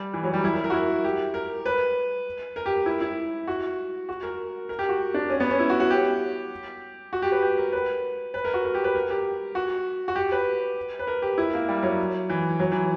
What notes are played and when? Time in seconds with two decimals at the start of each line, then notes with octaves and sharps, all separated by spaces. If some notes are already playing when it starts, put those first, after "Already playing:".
Already playing: G3
0.14 E3
0.24 F#3
0.33 G3
0.44 E4
0.54 A#4
0.64 A#4
0.70 F#4
0.73 E4
1.04 G4
1.34 A#4
1.66 B4
2.56 A#4
2.66 G4
2.86 E4
3.01 E4
3.47 F#4
4.09 F#4
4.23 A#4
4.69 A#4
4.79 G4
4.89 F#4
5.14 D4
5.29 C#4
5.40 B3
5.51 C#4
5.60 E4
5.70 F#4
5.80 F#4
5.90 G4
7.13 F#4
7.22 G4
7.32 B4
7.42 G4
7.58 A#4
7.72 B4
8.34 B4
8.44 A#4
8.54 F#4
8.65 A#4
8.75 G4
8.84 B4
8.95 A#4
9.10 G4
9.55 F#4
10.08 F#4
10.16 G4
10.32 B4
10.99 B4
11.07 A#4
11.22 G4
11.38 E4
11.54 A#3
11.68 G3
11.83 F#3
12.30 E3
12.60 F#3
12.72 E3